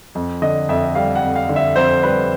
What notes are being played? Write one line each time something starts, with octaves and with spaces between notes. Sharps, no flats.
F2
D3 D#5
F2 E5
G3 F5
F#5
F2
F5
D3
E5
F2 C5
G3 B4